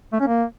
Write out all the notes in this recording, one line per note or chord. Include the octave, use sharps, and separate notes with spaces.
A3
C#4
A#3